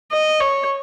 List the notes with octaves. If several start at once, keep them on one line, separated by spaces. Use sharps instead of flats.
D#5
C#5